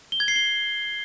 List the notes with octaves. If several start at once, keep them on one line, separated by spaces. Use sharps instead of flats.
G7
G#6
C7
G7